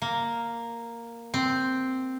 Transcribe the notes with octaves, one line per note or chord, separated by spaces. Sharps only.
A#3
C4